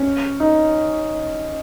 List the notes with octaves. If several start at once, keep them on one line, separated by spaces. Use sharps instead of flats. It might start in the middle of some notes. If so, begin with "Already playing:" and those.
Already playing: C#4
D#4